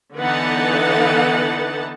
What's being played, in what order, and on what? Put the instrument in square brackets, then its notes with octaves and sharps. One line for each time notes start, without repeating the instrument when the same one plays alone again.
[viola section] D3 E3 B3 D#4 F#5 A5